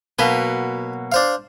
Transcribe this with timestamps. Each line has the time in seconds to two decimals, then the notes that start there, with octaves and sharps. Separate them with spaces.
0.19 B2 F#3 A#3 B4
1.12 D4 C5 F5